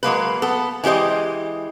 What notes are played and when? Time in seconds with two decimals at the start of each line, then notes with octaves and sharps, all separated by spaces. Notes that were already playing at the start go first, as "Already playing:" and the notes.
0.03 F#3 G#3 A#3 B4
0.42 B3 A4
0.84 E3 G#3 G4 C5 D#5